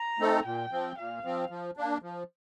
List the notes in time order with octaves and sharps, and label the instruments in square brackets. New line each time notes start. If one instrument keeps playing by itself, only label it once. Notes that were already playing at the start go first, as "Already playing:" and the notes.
Already playing: [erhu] A#5
[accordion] A3 C4 D#4 A4
[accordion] A#2 [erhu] G5
[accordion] F3 C4
[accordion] A#2 [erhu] F5
[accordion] F3 C4
F3
A#3 D4
F3